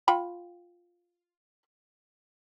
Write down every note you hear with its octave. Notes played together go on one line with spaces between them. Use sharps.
F4 G5 B5